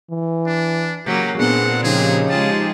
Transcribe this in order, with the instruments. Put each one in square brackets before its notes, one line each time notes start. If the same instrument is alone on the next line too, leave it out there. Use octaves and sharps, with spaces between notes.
[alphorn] E3
[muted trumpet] D4
[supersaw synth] C#3 [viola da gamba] F#3 A#3 [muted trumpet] G4
[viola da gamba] A#2 C4 [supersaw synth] B3 D4 C7 [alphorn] G#4 [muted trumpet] F#5
[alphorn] C#3 [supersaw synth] F3 D#4 G4 [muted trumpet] G#4
[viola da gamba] G#3 F4 G#4 [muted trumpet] A5